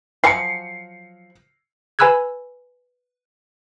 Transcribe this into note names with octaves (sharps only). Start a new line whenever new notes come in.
F3 F#3 G#5 C7 C#7
B4 G#5 B5 E6 F#6 G#6